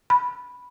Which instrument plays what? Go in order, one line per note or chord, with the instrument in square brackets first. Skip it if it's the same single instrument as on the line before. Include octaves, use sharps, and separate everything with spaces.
[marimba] B5